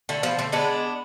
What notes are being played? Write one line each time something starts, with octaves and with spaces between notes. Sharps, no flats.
D3 A3
F3 B3
D3 A3 C4
G#3 B3 D4